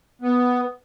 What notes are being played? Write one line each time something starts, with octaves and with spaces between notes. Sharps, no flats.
B3